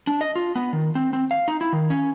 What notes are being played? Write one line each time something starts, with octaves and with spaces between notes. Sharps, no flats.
D4
D#5
F4
B3
D#3
C4
C4
F5
D#4
E4
D#3
C#4